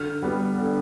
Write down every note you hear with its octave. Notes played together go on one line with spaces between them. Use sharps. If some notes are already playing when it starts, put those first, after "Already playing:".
Already playing: D3 F6
G3 B3
D3